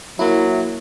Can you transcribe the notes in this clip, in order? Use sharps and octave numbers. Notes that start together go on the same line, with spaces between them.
F#3 A#3 E4